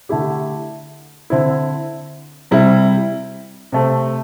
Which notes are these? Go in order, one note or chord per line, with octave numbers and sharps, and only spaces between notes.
D3 A3 E4 G4
D3 C4 E4
C3 G3 E4
C3 A3 C4